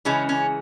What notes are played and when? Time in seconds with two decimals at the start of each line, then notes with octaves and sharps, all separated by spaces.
0.05 C#3 E3 G#3 C#4
0.29 C#4